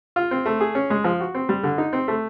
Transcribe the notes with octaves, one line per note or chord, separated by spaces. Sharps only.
F4
C4
A3
G#4
C#4
G#3
F3
F#4
C4
G3
D3
D#4
C4
A3